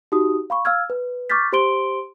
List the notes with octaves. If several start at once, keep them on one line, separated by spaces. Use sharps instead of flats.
D#4 F#4 G4 D#6
F5 B5 C#6
F5 E6 F6 G#6
B4
C#6 D6 F6 G6 A6 B6
G4 C5 C6 D7 G7